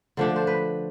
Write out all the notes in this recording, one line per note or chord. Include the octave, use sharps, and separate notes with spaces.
D3 F3 A3 D4
C5
B4